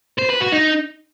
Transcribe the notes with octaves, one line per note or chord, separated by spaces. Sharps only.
C5
B4
F#4
D#4